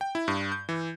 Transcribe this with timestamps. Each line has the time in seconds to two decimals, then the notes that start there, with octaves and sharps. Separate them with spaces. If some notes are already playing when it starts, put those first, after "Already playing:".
0.01 G5
0.15 E4
0.28 G2
0.52 G6
0.69 E3